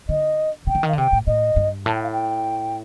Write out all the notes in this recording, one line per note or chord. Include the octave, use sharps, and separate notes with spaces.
D3 D#5
C3 G5
D3
D#3
F5
D3
C3 G5
A2
A2 D#5
G2
A2 A5
G5
F5
G5